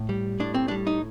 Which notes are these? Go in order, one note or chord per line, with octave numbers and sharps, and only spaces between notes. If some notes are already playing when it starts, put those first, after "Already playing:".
Already playing: A2
G3
A2 D4
C4
D4
G3
D#4